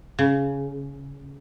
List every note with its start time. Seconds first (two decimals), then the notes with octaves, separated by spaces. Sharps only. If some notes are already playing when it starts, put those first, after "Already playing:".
0.19 C#3